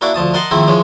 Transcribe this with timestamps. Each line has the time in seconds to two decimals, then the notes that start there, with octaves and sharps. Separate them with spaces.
0.01 A#3 D4 E4 F#4 D6
0.14 D2 F3 A5 D#6
0.34 A#4 D#5 F#5 A5 C6
0.51 G#2 D#3 F3 A#3 C4 E4
0.68 E3 F3 G#3 C#4